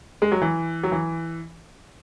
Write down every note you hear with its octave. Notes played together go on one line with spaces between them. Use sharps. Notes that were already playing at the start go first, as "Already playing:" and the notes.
G#3
F#3
E3
F#3
E3